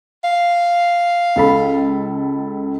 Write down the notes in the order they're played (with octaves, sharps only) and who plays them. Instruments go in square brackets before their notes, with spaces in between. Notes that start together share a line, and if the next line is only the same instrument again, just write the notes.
[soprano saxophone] F5
[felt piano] C#2 A4 B5